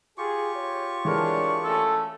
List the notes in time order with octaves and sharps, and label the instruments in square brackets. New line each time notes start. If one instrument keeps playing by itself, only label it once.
[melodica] F4 G4 C#6 [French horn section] G#4
[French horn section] C#5
[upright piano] E3 G#3 A#4 [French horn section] D4 [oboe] C#5
[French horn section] A3 C#4 [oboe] A4